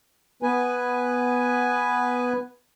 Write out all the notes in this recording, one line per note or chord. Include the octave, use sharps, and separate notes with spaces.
B3 B4 G#5